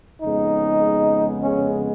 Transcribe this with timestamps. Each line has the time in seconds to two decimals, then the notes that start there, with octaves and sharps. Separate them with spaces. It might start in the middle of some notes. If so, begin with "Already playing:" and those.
0.22 F2 C#3 G#3 B3 D#4
1.41 C#4